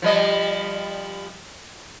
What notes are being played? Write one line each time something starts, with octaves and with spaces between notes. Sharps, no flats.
F3 G3 D#5